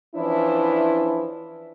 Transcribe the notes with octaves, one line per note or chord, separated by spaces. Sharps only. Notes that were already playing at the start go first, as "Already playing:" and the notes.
E3 F3 C#4 D4 E4